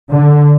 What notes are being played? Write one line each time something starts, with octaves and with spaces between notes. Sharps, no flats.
D3